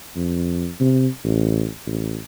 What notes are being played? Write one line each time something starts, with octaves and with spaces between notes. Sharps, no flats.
F2
C3
A1
A1